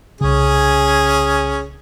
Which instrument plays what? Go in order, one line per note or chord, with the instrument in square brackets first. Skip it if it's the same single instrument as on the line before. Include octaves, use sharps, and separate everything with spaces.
[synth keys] C2 C#3 [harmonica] C#4 G#4